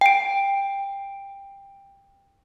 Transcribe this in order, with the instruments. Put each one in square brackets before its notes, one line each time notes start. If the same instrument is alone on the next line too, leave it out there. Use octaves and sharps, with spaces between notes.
[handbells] G5 D7